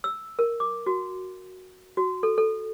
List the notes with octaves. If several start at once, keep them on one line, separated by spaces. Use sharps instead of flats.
E6
A#4
D6
F#4
F#4
A4
A4